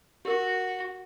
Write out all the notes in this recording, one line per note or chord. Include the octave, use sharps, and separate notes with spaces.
F#4 G4 A#4